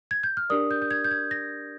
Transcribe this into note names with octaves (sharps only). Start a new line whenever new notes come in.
G#6
G6
F6
D4 G4 A#4 D5 D#6
G6
G6
G#6
G6
G#6
A#6